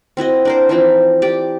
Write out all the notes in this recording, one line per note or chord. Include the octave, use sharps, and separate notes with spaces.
C4 E4 F#4 D#5
D4 A#4 C5
E3 F3 C4 D#4
G4 D5